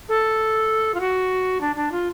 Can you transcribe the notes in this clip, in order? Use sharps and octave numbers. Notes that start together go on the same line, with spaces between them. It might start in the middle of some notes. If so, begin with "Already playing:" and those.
A4
F4
F#4
D4
D4
F4